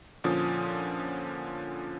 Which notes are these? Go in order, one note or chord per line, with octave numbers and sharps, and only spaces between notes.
A#2 D3 F3 C#4 F4 D#6